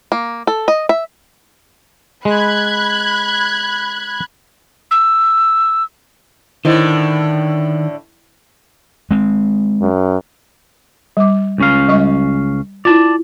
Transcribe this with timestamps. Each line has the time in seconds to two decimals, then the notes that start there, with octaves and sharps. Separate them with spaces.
0.12 A#3
0.47 A4
0.68 D#5
0.89 E5
2.25 G#3 B5 F#6 G#6
4.91 E6
6.65 A2 D3 D#3 E4 C5 D#5
9.11 G#3 C4
9.82 F#2
11.17 G3 D6
11.58 C#2 C#4 F5
11.88 G3 D#5 C#6
12.85 E4 F4 D5 A5